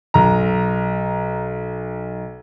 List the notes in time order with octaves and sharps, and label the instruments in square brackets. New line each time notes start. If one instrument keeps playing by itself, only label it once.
[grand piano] B1 A#5